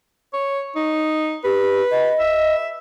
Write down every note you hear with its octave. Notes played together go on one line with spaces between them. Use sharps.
C#5
D#4
G4 B4
D#5
E5